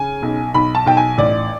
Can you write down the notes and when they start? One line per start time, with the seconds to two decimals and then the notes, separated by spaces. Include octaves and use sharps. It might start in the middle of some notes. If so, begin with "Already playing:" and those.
Already playing: C#3 G#5
0.22 B1
0.54 B1 B5
0.75 A5
0.86 B1 G5
0.97 G#5
1.18 A1 D5